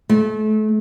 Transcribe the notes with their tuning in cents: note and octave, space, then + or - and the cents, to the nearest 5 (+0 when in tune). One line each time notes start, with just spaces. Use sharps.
A3 -35